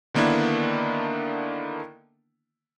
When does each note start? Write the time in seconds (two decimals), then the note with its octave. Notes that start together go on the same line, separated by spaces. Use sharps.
0.14 D3 D#3 A#3 B3 D4 E4